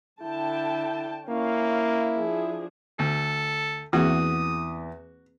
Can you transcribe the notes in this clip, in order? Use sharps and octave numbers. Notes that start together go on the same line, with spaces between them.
D3 E4 G5 A5
A#3 C#4 E4 F5
F3 D4 G#4
D2 A4
E2 A#3 C4 F#4 G#4 D#6